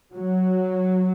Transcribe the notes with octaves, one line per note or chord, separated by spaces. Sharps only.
F#3